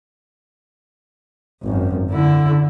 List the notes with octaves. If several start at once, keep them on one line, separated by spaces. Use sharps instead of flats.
G#1 F#2
D3 E4